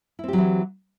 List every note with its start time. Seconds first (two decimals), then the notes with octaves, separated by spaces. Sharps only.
0.19 E4
0.24 C4
0.28 G4
0.33 F#3
0.38 E3